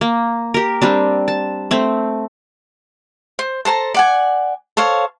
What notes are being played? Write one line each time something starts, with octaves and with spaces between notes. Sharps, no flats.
A#3
G4 A#4
G3 C4 D4
A5
A3 C4
C5
A4 C5 A5 A#5
D5 F#5 G#5
A4 C5 C#5 F5